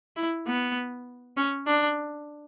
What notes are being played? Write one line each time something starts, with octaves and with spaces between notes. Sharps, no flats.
E4
B3
C#4
D4